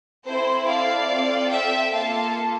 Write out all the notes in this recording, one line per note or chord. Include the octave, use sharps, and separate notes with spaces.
C4 E4 A4 C5
D5 F5
C4 F4 A4
E5 G5
A#3 F4 A4 F5 A5